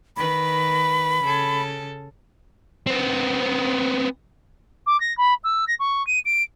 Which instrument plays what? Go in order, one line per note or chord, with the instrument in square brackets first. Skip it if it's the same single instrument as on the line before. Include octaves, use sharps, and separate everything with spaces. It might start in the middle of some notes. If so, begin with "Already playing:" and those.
[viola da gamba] D#3 B4 [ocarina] B5
[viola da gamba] C#3 A4
[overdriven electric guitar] B3 C4
[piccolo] D6
A#6
B5
E6
A#6
C#6
D#7
D7